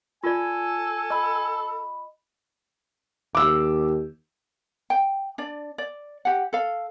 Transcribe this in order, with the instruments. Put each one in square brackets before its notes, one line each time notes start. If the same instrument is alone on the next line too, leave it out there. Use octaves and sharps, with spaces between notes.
[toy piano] F4 D5 [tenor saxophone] A4 [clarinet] G#5
[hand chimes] D#5 B5 [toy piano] E6
[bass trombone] D#2 [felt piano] D6 E6
[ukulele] G5
D4 D5
D5
G4 F#5
A4 F5